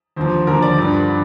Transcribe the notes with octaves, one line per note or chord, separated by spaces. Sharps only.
D#2 D3 F3 C5
D#2 D3 F3 A#4
D5
G2 D3 F3
D3